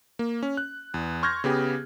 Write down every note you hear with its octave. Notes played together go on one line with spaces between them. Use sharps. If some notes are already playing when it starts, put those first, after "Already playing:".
A#3
C#4
F#6
E2
C6 C#6 F6 G6 G#6 A#6
C#3 B3 G4 G#4